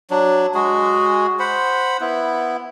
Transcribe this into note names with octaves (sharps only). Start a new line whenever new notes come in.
F#3 D4
G#3 F#4 G#4
C5 F#5 B5
B3 E4